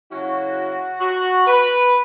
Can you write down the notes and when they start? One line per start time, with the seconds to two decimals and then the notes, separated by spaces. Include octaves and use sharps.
0.10 C#3 F#3 C#4 E4 F#4
1.01 F#4
1.47 B4